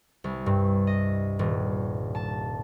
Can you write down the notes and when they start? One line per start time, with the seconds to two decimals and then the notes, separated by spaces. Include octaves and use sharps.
0.24 C2
0.46 G2
0.87 D#5
1.39 D#1
2.15 A5